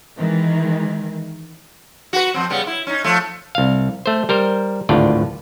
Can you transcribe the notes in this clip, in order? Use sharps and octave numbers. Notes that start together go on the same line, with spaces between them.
D#3 E3 G#3
F#4 B4
F2 C4
C#3 G3 B3
E4
C#4 D#4
F3 A3
C2 F5
A3 C5
G3 A#4 C5
G#1 D2 A2 F4 D5